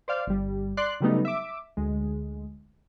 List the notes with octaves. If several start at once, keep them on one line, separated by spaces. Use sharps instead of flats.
C5 D5 F5
G1 G3
D5 C6 F#6
C#3 F#3 G3 A3 B3 D#4
E5 D6
D2 G#3